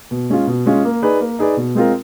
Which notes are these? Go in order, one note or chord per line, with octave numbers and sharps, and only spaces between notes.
B2
G#3 C#4 F4
B2
G#3 C#4 F4
A#3
D#4 G#4 B4 D5
A#3
D#4 G#4 B4 D5
B2
G#3 C4 F4 A#4